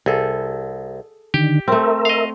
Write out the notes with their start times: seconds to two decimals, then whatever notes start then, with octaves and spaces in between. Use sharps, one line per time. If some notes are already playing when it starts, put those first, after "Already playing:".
0.06 C2 G#4 A4
1.34 D3 D#3 G4
1.68 A3 C4 A#4 E5
2.05 D#5 F5